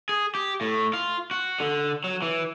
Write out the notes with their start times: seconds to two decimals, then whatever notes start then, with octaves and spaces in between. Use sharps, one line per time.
0.09 G#4
0.35 G4
0.61 A2
0.93 F4
1.31 F#4
1.60 D3
2.04 F#3
2.22 E3